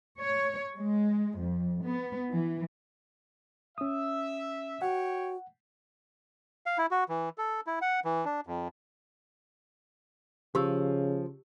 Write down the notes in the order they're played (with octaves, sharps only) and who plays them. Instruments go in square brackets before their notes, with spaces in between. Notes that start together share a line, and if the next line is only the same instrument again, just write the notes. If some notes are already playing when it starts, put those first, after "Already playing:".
[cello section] C#5
G#3
F2
B3
E3
[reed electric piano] C#4 D#6 [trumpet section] E5
[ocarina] F#4 [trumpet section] C#5 G5 [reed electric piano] F#5
[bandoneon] F5
E4
F#4
E3
A4
E4
F#5
E3
D4
F2
[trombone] C#3 [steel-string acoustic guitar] F3 [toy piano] G4 C#6 E6